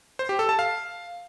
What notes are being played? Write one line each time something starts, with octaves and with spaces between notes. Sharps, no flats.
C5
G4
A4
A5
F5